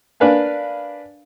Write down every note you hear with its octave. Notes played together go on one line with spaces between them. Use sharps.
D4 A#4 B4 F5 G#5